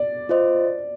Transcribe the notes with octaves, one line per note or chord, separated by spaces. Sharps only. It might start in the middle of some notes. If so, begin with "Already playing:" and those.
Already playing: D5
F4 C5 D#5